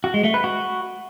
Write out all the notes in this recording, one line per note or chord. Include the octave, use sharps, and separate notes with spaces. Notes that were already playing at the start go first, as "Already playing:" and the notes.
F#4
G#3
A3
B4
F#4